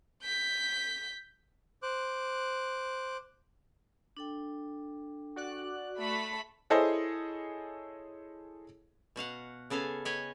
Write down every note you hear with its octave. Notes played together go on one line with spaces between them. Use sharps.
G6 B6
C5 D6 F#6
D4 A4 G5
F#4 D5 F#6
A3 B5
E4 G#4 A4 C5 C#5 D#5
B2 F#4 F5 F#5
C#3 B3 A4 F5 G#5
B4 C#5 D#5 G5 G#5